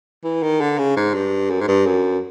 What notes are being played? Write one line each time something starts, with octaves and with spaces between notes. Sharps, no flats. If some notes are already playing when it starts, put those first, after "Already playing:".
E3
D#3
D3
C#3
G#2
G2
F#2
G#2
G2
F#2